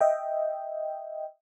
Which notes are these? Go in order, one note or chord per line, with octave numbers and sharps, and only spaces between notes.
D#5 E5 G5